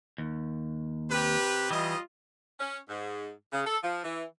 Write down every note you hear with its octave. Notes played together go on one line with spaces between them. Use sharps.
D#2
C3 G4 B4
E3 G3 F4 D#5
C#4
G#2
C#3
A4
F3
E3